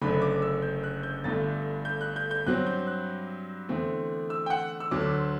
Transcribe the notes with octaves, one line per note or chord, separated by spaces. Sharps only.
F#1 F#2 D3 A3 D4 B5
D6
E6
G6
F#6
G6
G1 G2 D3 A3 A6
G6
F#6
G6
G6
G2 F#3 C4 F#6
G6
F#6
E2 D3 A3 C4
E6
G5
F#5
E6
D2 D3 F#3 D6
C6